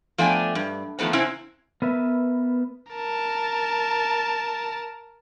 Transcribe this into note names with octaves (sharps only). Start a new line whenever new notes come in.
F3 A3 B3 D4 G5 G#5
G2
D#3 F3 A3 B3 C4
C3 C4 C#4 E4
B3 A#4 B4 E5
A#4 A5